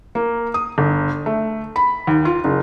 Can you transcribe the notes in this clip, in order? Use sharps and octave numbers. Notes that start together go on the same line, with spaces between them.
A#3
D#6
G1
A3
B5
D#2
F4
F#1